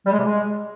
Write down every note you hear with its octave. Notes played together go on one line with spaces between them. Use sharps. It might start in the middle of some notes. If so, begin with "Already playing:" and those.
G3
G#3
C3
G#3